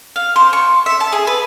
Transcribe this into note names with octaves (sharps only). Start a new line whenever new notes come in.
F5
C5
C#6
E5
A5
G#4
B4